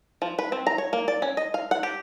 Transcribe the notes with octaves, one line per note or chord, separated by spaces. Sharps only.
F3
B4
C4
A#5
C#5
A#3
D5
C#4
D#5
F5
F#5
G4